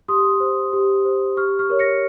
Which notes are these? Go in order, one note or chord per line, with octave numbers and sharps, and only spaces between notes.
G4 C6 D#6
C5
G4
C5
G4 C#6 F6
C#6 F6
A#4 C#5
A#6 C#7